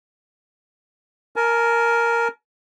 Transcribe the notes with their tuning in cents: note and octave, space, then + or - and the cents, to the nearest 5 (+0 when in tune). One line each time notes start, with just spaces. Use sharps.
A#4 +0 G#5 +45